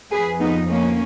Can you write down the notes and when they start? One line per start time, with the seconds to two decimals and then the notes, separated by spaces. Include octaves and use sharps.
0.11 F2 F3 G#4 B4
0.40 B3 D#4
0.68 A#3 C#4